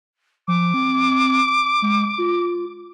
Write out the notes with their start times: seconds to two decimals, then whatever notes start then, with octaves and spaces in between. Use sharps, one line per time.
0.48 F3 D6
0.74 C4
1.82 G#3
2.18 F4